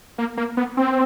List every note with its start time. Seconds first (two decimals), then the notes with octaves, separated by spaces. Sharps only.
0.18 A#3
0.37 A#3
0.57 B3
0.77 C4